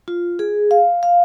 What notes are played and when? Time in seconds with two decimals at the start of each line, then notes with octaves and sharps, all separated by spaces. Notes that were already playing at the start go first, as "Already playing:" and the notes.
0.08 F4
0.39 G#4
0.71 F5
1.03 F5